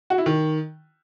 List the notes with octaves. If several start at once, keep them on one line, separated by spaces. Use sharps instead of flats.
F#4
E4
D#3